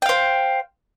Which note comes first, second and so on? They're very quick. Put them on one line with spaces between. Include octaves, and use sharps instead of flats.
G5 F5 C5